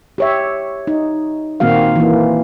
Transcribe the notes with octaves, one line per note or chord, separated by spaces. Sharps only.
G4 C#5 E5
D#4
A#2 D#3 A#3 C4 F#4 F5
E3 A#3